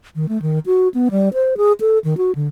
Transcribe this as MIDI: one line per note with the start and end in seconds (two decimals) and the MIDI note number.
0.16 0.28 51
0.29 0.41 57
0.42 0.59 51
0.66 0.88 66
0.94 1.09 59
1.11 1.29 55
1.34 1.57 72
1.57 1.72 68
1.81 1.98 69
2.04 2.14 51
2.17 2.32 66
2.35 2.48 50